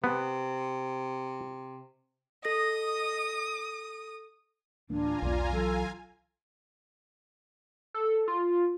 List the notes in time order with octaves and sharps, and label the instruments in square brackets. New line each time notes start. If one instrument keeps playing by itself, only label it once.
[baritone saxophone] C3 [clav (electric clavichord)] B3
[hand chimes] A4 A#6 [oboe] D#5 [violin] D#6
[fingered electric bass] D1 E3 A#3 [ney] D4 [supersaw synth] F4 G#5 A#5
[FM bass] B1 [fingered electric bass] E2 B3 [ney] D5
[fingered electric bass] E3 F#3 [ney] A4 [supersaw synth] F5 G#5
[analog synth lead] A4
F4